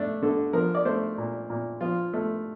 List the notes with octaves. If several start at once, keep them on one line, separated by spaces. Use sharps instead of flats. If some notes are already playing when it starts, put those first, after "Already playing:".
Already playing: A3 D4
D3 A4
F3 A#4
D5
A3 C5
A#2
A#2
F3 F4
A3